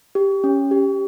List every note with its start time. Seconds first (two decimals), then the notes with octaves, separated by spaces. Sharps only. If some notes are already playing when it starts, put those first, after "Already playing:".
0.15 G4
0.44 C#4
0.71 G4